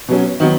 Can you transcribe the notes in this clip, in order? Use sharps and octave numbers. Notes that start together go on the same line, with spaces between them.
B2 F#3 C#4
D#3 F#3 B3